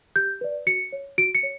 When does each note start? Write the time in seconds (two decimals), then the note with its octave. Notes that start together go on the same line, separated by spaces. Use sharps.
0.16 G4 G6
0.41 B4 D5
0.67 F#4 C#7
0.92 C#5
1.18 F#4 D7
1.35 C#7
1.43 C#5